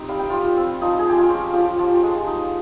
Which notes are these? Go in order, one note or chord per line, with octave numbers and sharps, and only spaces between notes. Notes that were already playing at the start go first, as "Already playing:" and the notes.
Already playing: C4 D#4 G4
G3 F5
G5
G3 F4 F5
C4
F3 D#4 D#5
G#4
G#3 G4
F4
C#4
F3 G4
F3
G#3
D#4